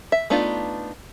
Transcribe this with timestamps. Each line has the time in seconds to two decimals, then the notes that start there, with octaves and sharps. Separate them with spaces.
0.12 E5
0.30 A3 B3 D4 D#4 F4